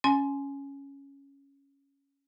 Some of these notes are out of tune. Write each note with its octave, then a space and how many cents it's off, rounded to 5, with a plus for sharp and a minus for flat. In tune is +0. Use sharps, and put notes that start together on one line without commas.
C#4 +0 G#5 +15 C6 +0